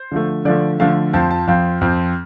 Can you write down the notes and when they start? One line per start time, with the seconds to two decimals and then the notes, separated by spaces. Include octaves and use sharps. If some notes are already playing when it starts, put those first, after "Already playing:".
Already playing: C5
0.12 D3 F3 A3
0.45 D3 F3 A3 D5
0.80 D3 F3 A3 F5
1.13 F2 F3 C4 A5
1.31 A5
1.47 F2 F3 C4 F5
1.81 F2 F3 C4